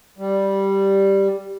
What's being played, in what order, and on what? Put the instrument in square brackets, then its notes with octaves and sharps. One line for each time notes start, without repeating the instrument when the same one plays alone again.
[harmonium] G3